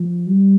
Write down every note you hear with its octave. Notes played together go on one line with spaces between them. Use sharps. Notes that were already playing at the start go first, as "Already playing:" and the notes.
Already playing: F3
G3